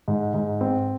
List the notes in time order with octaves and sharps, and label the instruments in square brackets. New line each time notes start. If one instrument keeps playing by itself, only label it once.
[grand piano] G#2
G#2
C4